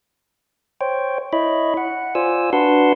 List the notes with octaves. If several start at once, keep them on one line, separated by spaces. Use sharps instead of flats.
C5 C#5 G5
E4 C#5 D#5 B5
F#5
F4 C5 D5 G#5 E6
D4 F#4 B4 F#5 A5 C6